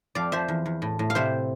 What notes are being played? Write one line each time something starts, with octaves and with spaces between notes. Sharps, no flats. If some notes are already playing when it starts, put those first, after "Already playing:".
F2 D5 F5
F3 C5 E5
E2
E2
A2
A2
F5
C3 C5 E5